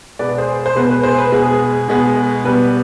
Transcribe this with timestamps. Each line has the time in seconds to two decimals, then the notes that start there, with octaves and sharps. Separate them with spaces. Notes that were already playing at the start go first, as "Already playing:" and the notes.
0.19 B2 G#3 B3 B4 D5
0.38 G#4 C5
0.66 C5
0.76 B2 G#3 B3 B4
0.90 B4
1.03 G#4 C5
1.18 B4
1.32 B2 G#3 B3 G#4
1.88 B2 G#3 B3
2.44 B2 G3 B3 B4